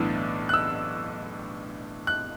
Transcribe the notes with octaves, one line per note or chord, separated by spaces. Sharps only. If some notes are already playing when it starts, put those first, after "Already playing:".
Already playing: B1 A2 E3 B3 D4
F#6
E6
F#6